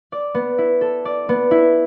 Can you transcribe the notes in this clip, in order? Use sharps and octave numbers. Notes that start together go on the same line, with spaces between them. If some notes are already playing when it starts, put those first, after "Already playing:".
D5
B3
E4
A4
D5
B3
E4